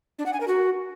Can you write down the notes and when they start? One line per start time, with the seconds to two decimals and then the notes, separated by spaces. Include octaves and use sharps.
0.19 D4
0.26 F#5
0.33 G#5
0.40 A#4
0.48 F#4